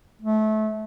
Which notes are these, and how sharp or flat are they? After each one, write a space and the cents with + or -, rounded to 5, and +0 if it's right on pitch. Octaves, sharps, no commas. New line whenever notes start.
A3 -25